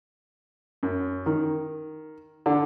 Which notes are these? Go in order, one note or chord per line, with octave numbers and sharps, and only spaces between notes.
F#2
D#3
D3